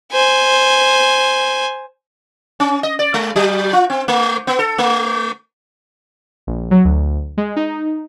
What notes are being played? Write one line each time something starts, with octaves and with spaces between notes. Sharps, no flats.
C5 G#5
C#4
D#5
D5
G#3
F#3
F4
C4
A3
B3
A4
A3
A#1
F#3
D2
G#3
D#4